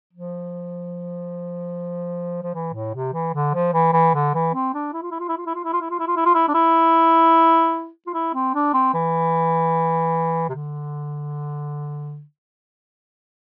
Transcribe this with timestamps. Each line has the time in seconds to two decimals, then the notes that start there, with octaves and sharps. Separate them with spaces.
0.13 F3
2.43 F3
2.54 E3
2.74 A2
2.94 C3
3.13 E3
3.34 D3
3.54 F3
3.73 E3
3.93 E3
4.14 D3
4.34 E3
4.54 C4
4.74 D4
4.93 E4
5.02 F4
5.11 E4
5.20 F4
5.28 E4
5.38 F4
5.46 E4
5.55 F4
5.64 E4
5.73 F4
5.81 E4
5.90 F4
5.99 E4
6.07 F4
6.16 E4
6.25 F4
6.35 E4
6.48 D4
6.54 E4
8.06 F4
8.14 E4
8.34 C4
8.55 D4
8.74 C4
8.94 E3
10.49 C3
10.55 D3